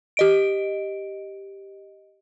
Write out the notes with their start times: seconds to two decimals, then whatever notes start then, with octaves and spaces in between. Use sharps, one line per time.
0.17 G4 D#5 D7